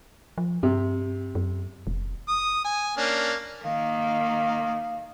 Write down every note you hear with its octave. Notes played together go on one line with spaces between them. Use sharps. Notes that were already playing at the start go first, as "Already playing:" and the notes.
F3
G2 C3
F#2
F1
D#6
G#5
A#3 C#4 D4
D#3 A#3 F5